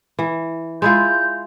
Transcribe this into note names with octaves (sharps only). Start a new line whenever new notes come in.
E3
G#3 E4 F4 G6